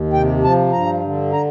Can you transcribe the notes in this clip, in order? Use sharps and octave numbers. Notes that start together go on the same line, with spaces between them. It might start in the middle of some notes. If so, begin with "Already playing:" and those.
Already playing: D#2
C3 G5
F3 A5
G2 A#5
D3
A#5